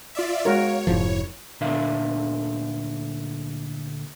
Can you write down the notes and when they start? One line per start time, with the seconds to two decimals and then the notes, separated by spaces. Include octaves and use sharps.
0.15 F4 D5 E5
0.45 G#3 F#4 A#4 C#5 F5
0.87 F1 G#2 F3 E4
1.61 D2 A#2 D3 D4 E5 F5